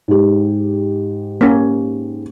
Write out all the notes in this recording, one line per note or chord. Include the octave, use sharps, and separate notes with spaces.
G#2 G4
A#3 C#4